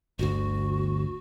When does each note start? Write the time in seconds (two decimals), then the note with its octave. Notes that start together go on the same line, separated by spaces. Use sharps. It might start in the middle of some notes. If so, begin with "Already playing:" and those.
0.19 G1 D2 F#4